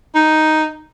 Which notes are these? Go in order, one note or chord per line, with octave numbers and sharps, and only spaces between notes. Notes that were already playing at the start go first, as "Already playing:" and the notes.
D#4